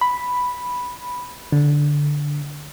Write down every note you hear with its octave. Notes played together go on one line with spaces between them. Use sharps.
B5
D3